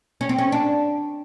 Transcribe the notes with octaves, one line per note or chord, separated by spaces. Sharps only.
C#4
C4
C#4
D4